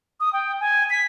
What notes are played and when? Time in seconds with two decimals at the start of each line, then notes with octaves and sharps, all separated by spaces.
0.20 D#6
0.33 G5
0.60 G#5
0.90 B6